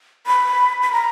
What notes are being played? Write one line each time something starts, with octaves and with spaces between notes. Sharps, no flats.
B5
B5
A#5